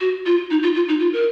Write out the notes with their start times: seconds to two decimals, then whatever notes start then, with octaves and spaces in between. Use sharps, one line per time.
0.01 F#4
0.26 F4
0.51 D#4
0.63 F4
0.75 F4
0.88 D#4
1.00 F4
1.13 A#4